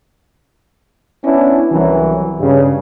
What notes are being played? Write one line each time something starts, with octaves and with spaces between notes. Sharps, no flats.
B3 C#4 D4 E4
C2 E3 F#3
G2 C#3